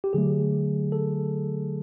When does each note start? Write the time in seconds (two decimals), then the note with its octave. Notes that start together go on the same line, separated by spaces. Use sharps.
0.04 G4
0.13 D3 F#3 A3 G#4
0.92 A4